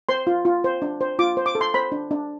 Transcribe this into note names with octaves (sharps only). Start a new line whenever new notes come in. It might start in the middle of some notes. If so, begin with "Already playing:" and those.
C5 C6
F4
F4
C5
D4
C5
F4 D6
C5
D6
A4
C6
C5 B5
D4
D4